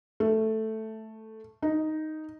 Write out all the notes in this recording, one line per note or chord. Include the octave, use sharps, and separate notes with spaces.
A3
D#4